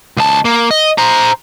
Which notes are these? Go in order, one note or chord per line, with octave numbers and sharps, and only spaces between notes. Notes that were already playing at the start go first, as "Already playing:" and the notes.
C#2 A5
A#3
D#5
C5 A#5